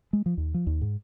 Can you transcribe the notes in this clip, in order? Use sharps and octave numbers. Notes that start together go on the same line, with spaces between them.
G#3
F3
D#2
F3
D#2
G#2